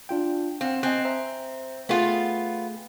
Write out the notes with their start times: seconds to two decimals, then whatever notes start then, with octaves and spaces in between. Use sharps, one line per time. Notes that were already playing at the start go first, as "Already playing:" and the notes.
0.09 D4 F4 G5
0.61 C4 F5 F#5
0.83 C4 D#5 G#5 F#6
1.05 C5 E5 A#5
1.89 A3 B3 F4 G#4 G5